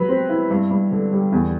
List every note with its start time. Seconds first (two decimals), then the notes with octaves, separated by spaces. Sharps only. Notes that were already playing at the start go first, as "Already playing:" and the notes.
Already playing: F#3 B4
0.09 C4
0.29 E4
0.50 G2
0.70 G2
0.91 D3
1.12 G3
1.32 E2